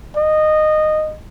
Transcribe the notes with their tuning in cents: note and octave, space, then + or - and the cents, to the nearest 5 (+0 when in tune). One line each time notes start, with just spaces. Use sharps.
D#5 -15